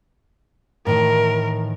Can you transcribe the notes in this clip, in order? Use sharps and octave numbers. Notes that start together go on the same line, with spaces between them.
A2 D#3 E3 A#4